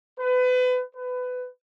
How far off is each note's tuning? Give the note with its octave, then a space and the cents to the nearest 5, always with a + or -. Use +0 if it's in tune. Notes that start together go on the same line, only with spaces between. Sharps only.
B4 +30
B4 +20